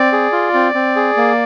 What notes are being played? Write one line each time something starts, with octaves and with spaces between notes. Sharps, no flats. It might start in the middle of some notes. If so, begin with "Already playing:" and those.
Already playing: C4 D5
G#4
F4
C4
C4
G#4
A#3